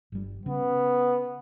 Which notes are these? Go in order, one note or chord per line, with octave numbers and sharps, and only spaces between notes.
G1 G3
C#3 B3 C#4